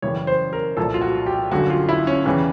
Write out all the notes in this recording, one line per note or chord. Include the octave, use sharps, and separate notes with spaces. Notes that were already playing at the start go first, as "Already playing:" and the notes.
F#1 F#2 C#3 E3 G3 C#5
C5
A#4
C2 A#2 F3 A4
F4
F#4
G4
G1 F#2 D3 G3 F#4
F4
E4
C#4
E2 C#3 E3 G3 C#4